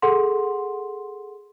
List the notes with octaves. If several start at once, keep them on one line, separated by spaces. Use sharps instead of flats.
G#4 A4 F#5 C6